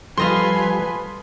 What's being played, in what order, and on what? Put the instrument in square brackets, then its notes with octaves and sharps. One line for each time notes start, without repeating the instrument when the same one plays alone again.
[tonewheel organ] F3 G3 [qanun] A4 D#5 F5 [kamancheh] B4 G#5 [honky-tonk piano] C6